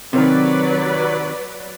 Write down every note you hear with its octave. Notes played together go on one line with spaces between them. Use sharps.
C3 D#3 F#3 B4 D5